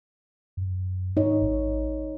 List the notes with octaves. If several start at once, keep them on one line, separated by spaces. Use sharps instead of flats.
F#2
G#2 D#4 C#5
A1